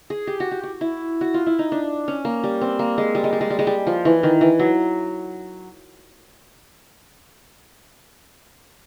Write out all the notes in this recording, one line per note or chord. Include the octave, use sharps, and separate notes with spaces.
G#4
G4
F#4
G4
F#4
E4
F#4
F4
E4
D#4
D4
C#4
A#3
G3
C4
A#3
G#3
G3
G#3
G3
G#3
G3
G#3
G3
F3
E3
D#3
E3
F#3